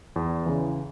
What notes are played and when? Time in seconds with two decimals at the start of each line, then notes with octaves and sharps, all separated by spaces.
0.16 E2
0.46 C#3 E3